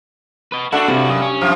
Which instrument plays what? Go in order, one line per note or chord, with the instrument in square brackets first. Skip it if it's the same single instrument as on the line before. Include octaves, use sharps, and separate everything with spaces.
[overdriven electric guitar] B4 D#5
[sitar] A3 D4 [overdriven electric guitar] E4 F#4 [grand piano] A4 F#5
[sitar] G2 [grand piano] C3
[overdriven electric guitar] F#2 [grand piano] D#6
[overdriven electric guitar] C#4
[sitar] F#2 F3